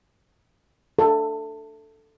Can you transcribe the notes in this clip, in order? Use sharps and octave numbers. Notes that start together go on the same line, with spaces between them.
A4